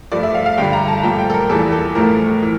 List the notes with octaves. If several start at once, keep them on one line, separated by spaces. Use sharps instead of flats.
G2 F3 A3 D5
E5
F5
F5
G2 D3 G3 G5
A#5
A5
A#2 F3 A3 G5
G5
A4
A#4
E2 E3 G3 A4
A4
A2 F3 A3 A#4
E3